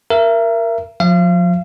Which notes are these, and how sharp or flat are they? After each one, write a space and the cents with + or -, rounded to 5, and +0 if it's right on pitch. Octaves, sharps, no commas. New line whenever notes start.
A#4 +0 E5 +30
F3 +35 F5 -35